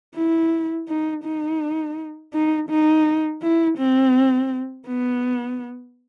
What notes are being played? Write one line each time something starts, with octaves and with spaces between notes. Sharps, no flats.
E4
D#4
D#4
D#4
D#4
E4
C4
B3